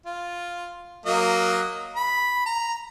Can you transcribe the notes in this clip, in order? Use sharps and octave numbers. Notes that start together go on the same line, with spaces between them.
F4
F#3 A#3 D#5
B5
A#5